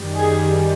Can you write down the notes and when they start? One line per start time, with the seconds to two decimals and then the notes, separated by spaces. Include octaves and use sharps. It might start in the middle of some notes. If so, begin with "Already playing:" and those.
Already playing: F#2 D#3 G3
0.15 G#4